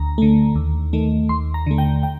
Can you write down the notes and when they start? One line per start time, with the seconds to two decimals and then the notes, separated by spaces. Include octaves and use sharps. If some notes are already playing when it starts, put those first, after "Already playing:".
Already playing: D2 A#5
0.18 D3 A3
0.55 D#2
0.93 D#3 A3
1.29 D#2 C6
1.54 A#5
1.66 D3 A3
1.78 G5
2.03 G5